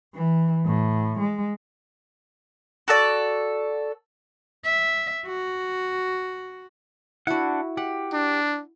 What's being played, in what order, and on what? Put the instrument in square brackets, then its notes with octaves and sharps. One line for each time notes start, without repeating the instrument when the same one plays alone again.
[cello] E3
A2
G#3
[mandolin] F#4 A4 D5
[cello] E5
F#4
[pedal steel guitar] D4 F#5 [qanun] E4 F#4
[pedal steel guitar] G4 [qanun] F#5
[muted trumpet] D4